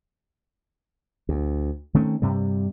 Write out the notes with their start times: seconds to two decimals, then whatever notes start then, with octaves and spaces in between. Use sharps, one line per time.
1.29 D2
1.94 D#3 A3 C4 C#4
2.22 G2 C3 G3